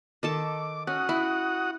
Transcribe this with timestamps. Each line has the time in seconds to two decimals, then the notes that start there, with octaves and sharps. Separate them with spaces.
0.23 D#3 A4 A5 D6
0.87 C#4 F#4 F#5 D#6
1.09 E4